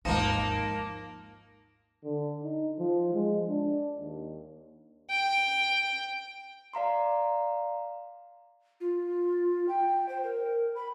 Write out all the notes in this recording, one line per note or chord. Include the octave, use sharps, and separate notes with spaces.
G#1 D#2 F3 A#3 D#4 A5 A#6 E7
D3
D#4
F3
G#3
D4
D#2
G5
D5 F5 A#5 C6
F4
G5
C5
A#4
B5